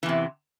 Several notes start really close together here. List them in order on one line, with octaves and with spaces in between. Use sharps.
E3 E2 C3